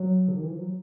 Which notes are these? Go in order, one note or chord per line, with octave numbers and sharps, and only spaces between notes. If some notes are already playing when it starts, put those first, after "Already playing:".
Already playing: F#3
D3
D#3
E3
F3
F#3